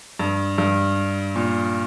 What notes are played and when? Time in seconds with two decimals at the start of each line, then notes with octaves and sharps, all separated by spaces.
0.19 G2
0.58 G2
1.36 A#2